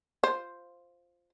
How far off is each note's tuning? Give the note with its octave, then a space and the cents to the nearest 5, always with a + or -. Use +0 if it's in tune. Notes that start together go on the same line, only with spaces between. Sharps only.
F4 +0 C5 +0